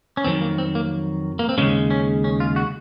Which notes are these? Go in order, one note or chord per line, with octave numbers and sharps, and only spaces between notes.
C#4
F2 D#3 F#3 C4
A#3
C4
A#3
A#3
C4
D#2 C#3 G#3 C#4
C#4
C#4
F4
F#4